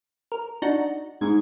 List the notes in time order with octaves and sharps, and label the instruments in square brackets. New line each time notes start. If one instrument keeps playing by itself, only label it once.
[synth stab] A#4
D4 D#4 F#4
[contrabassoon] G#2 [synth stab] G#6